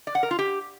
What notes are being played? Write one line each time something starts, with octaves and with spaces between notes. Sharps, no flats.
D5
F#5
A#4
F4
G4